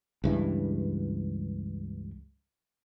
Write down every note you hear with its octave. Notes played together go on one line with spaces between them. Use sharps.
C#2 G2 E3